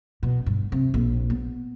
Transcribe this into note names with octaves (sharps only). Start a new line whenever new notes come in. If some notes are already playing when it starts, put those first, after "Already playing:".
B2
G2
C3
A#1
B3